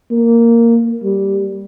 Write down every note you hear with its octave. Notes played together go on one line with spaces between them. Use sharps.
A#3
G3